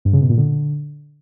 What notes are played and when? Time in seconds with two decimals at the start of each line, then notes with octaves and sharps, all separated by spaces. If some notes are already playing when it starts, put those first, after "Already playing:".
0.05 G2
0.13 C#3
0.21 B2
0.29 A#2
0.37 D3